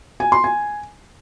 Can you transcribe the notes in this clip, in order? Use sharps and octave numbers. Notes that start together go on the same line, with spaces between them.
G#5
C6
G#5